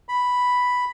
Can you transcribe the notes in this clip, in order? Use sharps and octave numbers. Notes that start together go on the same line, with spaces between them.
B5